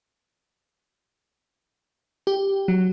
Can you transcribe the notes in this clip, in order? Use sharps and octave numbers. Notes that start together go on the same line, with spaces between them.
G4
F#3